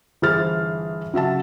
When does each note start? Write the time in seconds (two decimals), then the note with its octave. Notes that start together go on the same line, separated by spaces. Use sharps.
0.22 G1 E3 G#4 C5 F6 A6
1.14 C#3 F#3 E5 A5